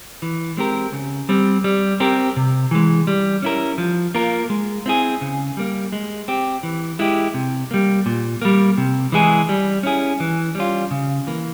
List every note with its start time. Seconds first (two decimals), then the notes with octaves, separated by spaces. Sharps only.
0.22 E3
0.57 G#3 C4 G4 A#4
0.93 C#3
1.29 G3 C4
1.64 G3
2.00 C4 G4 A#4
2.36 C3
2.71 E3 G#3
3.07 G3
3.42 C#4 E4 A#4
3.78 F3
4.15 A#3 F4 A#4
4.50 G#3
4.86 C4 E4 G#4
5.21 C#3
5.57 G3 A#3
5.92 G#3
6.28 C4 G4
6.63 E3
6.99 G#3 E4 G4
7.34 C3
7.71 G3 A#3
8.06 A#2
8.42 G3 A#3
8.78 C3
9.12 E3 G#3 E4 G#4
9.49 G3
9.83 C#4 E4 G#4
10.20 E3
10.55 G3 C#4 F4
10.91 C#3
11.27 E3 A#3